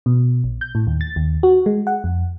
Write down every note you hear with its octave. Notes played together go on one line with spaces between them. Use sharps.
B2
A#1
G6
A2
D#2
A6
D#2
F#4
G#3
F#5
F2